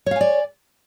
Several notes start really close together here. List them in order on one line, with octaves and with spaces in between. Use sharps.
C#5 F5 G#5 D5